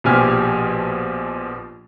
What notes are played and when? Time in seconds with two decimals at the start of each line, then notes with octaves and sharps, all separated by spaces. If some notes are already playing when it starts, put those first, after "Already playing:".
0.04 A#1 B2 F3 G4 G#5 F6